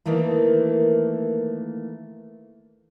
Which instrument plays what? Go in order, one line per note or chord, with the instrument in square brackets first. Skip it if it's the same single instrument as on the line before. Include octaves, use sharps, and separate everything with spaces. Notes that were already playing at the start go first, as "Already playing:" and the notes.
[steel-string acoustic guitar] D#3 E3 A3 A#3